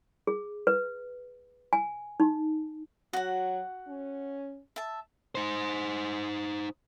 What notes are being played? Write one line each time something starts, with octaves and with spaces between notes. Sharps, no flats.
G#4
B4
G#5
D#4
F#3 F#4 F#5
C#4
E5 A5
D#4 C5